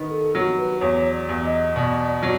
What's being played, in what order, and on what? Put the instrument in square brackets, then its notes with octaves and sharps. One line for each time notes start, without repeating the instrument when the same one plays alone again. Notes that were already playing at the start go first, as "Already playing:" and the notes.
Already playing: [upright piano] D#3 B3
[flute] A4
[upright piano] F#3
[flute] B4
[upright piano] E2 [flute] C#5
[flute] D5
[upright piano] E2
[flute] D#5
[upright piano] B2 [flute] D5
[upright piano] F#3